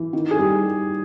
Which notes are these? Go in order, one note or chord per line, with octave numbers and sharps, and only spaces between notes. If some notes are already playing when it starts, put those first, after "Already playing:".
Already playing: E3
D#3
G#4
G3